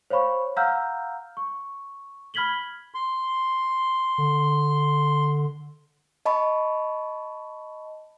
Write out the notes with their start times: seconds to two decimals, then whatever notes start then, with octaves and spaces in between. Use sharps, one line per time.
0.10 C5 C#5 F5 B5 C#6
0.56 F5 F#5 A#5 E6 F6 G6
1.37 C#6
2.34 B5 F6 G#6 B6 F#7 G7
2.94 C6
4.18 D3
6.26 D#5 A5 B5 C#6